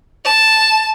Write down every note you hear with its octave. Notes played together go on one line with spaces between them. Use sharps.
A5